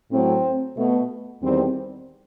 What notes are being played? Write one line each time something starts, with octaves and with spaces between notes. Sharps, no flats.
A2 F#3 A3 C4
B2 A3
E2 D#3 G3 C4